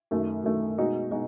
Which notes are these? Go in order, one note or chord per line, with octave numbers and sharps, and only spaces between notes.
F#2 D#3 A3
F#2 D#3 A3
B2 G#3 D#4 F#4
B2 G#3 D#4 F#4